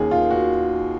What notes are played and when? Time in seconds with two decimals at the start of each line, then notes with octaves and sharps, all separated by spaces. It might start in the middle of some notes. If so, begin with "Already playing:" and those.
Already playing: D#2 D#3 A#3 C#4 G#4
0.11 F4
0.31 F#4